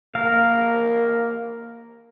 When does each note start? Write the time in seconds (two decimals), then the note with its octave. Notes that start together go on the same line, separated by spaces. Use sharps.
0.15 A#3 A#4 F5